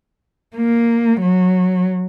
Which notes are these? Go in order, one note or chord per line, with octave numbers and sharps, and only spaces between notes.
A#3
F#3